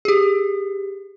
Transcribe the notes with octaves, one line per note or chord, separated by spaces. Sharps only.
G4 G#4